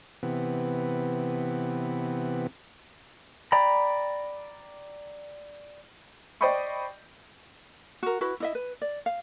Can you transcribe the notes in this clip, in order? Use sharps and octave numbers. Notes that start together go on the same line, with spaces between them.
C3 E3 B3
D5 G5 A#5 B5
C5 D5 D#5 G5 B5 C#6
F#4 A#4
E4 F#4 B4
E4 D#5 E5
B4
D5
F5